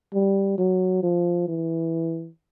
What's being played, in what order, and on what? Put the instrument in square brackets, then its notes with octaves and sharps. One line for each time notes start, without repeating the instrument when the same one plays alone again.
[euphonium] G3
F#3
F3
E3